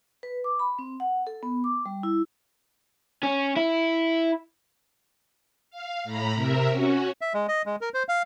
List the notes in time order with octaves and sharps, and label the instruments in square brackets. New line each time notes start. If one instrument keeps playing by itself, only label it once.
[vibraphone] B4
D6
B5
C4
F#5
A4
B3
D6
G3
E4
[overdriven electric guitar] C#4
E4
[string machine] F5
A2 A#5 B5
C3 A#4 E5
C#4 F#4
[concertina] E5
G#3
D#5
G#3
A#4
C5
F5